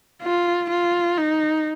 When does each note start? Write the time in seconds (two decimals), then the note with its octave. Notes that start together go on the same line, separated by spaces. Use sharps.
0.22 F4
0.70 F4
1.18 D#4